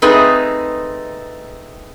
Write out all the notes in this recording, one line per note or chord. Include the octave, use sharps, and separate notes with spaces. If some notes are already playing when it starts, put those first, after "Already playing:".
A3 C4 D#4 G#4 B4